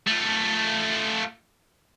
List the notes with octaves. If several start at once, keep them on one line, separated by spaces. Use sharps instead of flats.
A3 F4